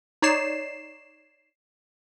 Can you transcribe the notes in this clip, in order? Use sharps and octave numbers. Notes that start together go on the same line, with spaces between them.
D#4 C#5 D5 C7 E7